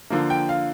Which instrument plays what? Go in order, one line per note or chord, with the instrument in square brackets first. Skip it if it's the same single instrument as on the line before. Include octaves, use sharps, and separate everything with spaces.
[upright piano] D3 F3 A#3
G5
F5